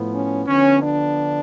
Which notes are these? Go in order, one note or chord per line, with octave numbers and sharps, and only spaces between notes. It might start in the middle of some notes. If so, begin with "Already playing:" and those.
Already playing: A2 F3 B3
C#4
D3 F3 B3 C#4
D4